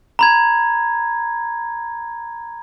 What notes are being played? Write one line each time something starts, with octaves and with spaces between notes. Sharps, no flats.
A#5 B5 G#6